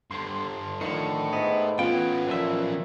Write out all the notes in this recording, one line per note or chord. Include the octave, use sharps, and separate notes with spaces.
G2 D3 C6
A2 D3 D#3 F3 C#7
G#2 B3 D#5
E3 B3 C#4 F4 G5
B1 A#2 F3 E5